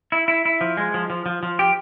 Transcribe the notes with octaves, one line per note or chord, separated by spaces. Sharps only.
E4
E4
E4
F3
G#3
F3
F3
F3
F3
G4